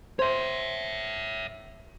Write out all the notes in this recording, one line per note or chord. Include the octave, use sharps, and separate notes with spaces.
C5 C#5 E5